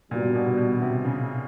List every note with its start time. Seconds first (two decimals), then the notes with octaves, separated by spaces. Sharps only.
0.11 A#2 D#3 G3 B3 D4 F#4
0.34 B2
0.57 B2
0.82 C3
1.04 C#3